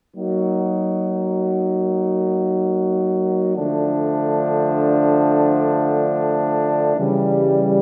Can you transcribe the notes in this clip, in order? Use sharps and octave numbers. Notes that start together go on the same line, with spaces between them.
F#3 A#3 D#4 F#4
D3 F3 A3 D4
C#3 E3 G3